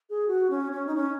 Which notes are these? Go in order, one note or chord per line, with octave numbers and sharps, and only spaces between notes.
G#4
F#4
C#4
C#4
D#4
C#4